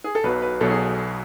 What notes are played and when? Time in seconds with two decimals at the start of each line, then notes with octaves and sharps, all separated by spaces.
0.04 G#4
0.15 A4
0.24 B1 B2 F#3 B4
0.42 B4
0.60 B1 B2 F#3 A4
0.70 G#4